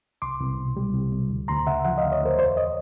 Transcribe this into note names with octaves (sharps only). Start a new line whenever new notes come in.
C2 C6 D6
C2
B2
G3
C2
C2
D2
D2 A#5 C6
C#3 E5 F#5
F3 E5 F#5
D#5 F5
D2
C#5 D#5
D2
A#4 C5
E2 C5 D5
C#5 D#5